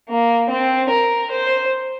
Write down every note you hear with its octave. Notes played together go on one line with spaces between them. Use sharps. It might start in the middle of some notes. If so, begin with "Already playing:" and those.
A#3
C4
A#4
C5